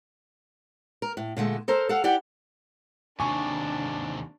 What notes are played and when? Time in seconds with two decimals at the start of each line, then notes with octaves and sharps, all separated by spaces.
1.02 A#4
1.17 A2
1.37 A#2 D3 G#3 A3
1.68 A4 A#4 C5
1.89 A4 F5 F#5
2.04 E4 G4 D5 F#5 G5
3.20 D#2 C3 D4 G#5 C#6